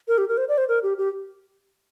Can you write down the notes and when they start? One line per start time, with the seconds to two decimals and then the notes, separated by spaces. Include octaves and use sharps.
0.08 A#4
0.18 G4
0.28 A#4
0.37 C5
0.49 D5
0.58 C5
0.69 A#4
0.83 G4
0.98 G4